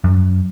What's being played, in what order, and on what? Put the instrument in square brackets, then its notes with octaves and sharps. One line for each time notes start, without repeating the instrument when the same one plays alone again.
[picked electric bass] F#2